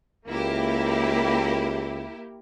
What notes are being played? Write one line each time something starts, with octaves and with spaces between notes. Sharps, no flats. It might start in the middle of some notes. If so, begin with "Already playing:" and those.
C#2 A#3 E4 G4